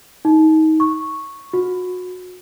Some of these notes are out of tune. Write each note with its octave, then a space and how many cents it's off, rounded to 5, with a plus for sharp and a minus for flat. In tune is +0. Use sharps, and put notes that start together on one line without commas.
D#4 +25
C#6 -5
F#4 -30